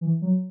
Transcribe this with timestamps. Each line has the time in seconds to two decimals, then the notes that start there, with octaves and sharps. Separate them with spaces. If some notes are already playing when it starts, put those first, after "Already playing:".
0.01 E3
0.22 F#3